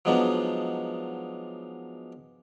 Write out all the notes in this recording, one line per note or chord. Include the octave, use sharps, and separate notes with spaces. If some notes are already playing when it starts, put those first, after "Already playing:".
F3 F#3 G#3 B3 D4 D#4